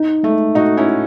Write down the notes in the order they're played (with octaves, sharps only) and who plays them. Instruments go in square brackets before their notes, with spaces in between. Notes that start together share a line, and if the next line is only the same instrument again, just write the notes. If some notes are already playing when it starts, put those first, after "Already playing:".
Already playing: [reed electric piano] D#4
[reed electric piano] G#3 [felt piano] A3
[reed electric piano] A2 [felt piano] D#4 F#4
[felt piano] C#4 E4
[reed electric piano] F#4